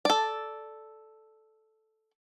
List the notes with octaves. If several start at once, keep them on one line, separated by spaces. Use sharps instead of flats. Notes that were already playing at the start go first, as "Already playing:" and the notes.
A4 D5